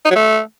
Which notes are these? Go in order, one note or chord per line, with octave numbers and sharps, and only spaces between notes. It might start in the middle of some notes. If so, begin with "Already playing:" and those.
D#4
F#3
A3